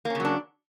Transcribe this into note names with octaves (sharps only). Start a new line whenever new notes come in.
C#3 F#3 A#3 C#4 D4